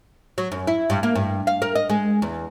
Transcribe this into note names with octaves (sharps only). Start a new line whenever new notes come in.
F#3
F#2
E4
G2
A#3
G2
F5
A#4
D#5
G#3
E2